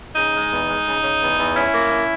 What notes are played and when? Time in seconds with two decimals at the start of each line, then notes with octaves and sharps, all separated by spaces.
0.15 C#3 D#4
0.33 G#3
0.50 E2
0.68 G#3
0.85 C#3
1.03 C#3
1.21 E2
1.38 E2
1.55 C#4 E4
1.72 A#3
1.90 C#4